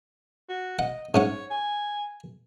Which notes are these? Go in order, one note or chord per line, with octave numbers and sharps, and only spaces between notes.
F#4
D#5 F#5
G#2 C#4 C#5 F#5
G#5